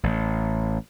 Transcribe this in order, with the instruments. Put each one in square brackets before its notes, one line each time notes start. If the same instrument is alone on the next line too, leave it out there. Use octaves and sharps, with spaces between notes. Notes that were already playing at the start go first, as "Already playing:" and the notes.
[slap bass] A1